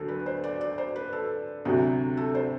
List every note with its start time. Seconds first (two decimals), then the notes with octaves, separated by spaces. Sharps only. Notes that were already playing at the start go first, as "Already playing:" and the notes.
Already playing: D2 D3 F#3 A4
0.08 B4
0.26 C5
0.44 D5
0.61 D5
0.78 C5
0.96 B4
1.13 A4
1.65 D2 C3 F#3
2.17 A4
2.35 C5